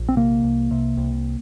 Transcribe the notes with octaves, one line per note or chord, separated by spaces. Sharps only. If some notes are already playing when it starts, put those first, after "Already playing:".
Already playing: A#1
C4
C3 A#3
C2
C3
C2